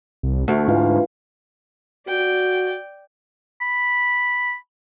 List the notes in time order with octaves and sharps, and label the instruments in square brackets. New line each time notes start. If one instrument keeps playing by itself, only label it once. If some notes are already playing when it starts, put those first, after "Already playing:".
[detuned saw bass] C2
[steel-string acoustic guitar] D2 [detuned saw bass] A3
[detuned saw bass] G#2 [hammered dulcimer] E3 F4
[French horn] F#4 [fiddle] D5 G5
[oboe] B5